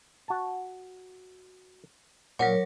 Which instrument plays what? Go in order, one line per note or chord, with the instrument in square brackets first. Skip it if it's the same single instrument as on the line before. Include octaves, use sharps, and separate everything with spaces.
[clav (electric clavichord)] F#4 A5
[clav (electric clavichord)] A#2 [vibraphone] F#3 A#4 C#5 [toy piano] F#5 D6